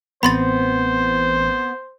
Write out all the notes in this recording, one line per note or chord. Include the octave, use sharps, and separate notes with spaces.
A1 B3 C4 C5 B5 C6 A6